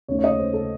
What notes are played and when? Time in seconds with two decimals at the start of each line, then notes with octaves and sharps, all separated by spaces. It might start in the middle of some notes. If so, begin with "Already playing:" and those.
0.08 D#2 C#3 A3 C#4 C#5
0.19 C#5
0.24 D#5
0.39 C5
0.53 A4